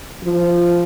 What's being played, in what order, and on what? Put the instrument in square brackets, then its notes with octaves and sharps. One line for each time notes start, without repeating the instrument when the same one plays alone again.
[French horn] F3